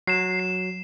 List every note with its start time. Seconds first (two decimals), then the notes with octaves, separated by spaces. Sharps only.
0.07 F#3 C7 E7
0.40 C7